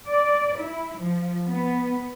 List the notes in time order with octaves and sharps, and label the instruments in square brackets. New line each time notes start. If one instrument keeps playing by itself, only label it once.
[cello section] D5
E4
F3
B3